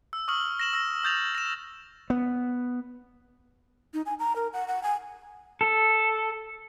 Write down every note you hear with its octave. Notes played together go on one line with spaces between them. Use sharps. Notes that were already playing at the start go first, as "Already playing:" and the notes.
E6
C#6 D#6 F6 F#7
A#6 E7 F#7
E6 A#6
D#6 G6 A6 F7
A#6 E7
B3
D#4
G#5
A#5
A#4
F#5
F#5
G#5
A4